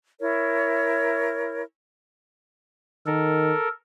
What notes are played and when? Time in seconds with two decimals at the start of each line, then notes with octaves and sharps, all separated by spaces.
0.20 E4 A#4 C#5
3.06 D#3 A4 A#4